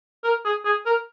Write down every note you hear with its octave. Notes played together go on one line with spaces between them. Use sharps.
A#4
G#4
G#4
A#4